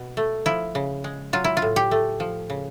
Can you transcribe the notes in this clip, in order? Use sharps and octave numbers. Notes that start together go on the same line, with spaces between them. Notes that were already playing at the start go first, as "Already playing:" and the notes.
Already playing: B2
A3
F3 E4
C#3
G#3
F#3 F4
E4
F4
A2
G4
A3
F3
C#3